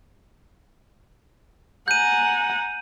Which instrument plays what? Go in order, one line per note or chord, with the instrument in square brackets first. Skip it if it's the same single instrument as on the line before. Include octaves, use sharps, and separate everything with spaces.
[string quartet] F#5 G#5 A#5 [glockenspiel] G6 D#7